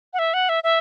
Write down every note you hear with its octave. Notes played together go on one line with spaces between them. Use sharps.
F#5
E5
F#5
E5
E5